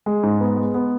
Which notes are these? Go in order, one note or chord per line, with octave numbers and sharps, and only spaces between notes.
G#3
G#2
B3
G#3
B3